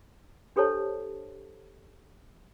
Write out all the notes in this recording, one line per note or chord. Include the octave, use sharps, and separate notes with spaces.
D4 G4 A4 C5 C#5 A5